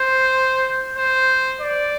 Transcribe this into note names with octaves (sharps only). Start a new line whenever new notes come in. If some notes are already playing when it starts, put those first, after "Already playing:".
Already playing: C5
C5
D5